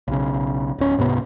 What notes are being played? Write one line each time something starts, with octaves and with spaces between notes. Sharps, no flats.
B1 C#3
D1 C#4
C#2 G#2 C3 B3